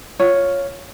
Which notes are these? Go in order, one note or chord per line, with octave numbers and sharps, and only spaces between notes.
F4 C#5